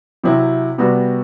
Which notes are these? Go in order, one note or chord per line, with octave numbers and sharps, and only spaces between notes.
C3 F#3 C4 E4
C3 G3 B3 F#4